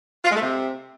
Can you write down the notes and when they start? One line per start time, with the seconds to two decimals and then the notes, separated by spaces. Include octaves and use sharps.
0.25 F4
0.30 G#3
0.36 A3
0.42 C3